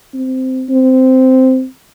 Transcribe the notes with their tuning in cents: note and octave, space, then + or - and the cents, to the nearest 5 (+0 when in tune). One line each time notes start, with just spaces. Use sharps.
C4 -10
C4 -10